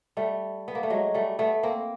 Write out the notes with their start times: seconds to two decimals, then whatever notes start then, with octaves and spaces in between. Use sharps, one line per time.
0.17 G3 A3
0.68 B3
0.75 A#3
0.83 A3
0.90 F#3 G#3
1.14 G3 A3
1.39 A3 B3
1.63 A#3 C4